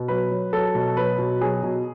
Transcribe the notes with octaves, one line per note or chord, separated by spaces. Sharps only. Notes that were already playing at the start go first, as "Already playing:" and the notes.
Already playing: B2
F#3 B4
F#3
F#3 A4
B2
F#3 B4
B2
F#3 G#4
B2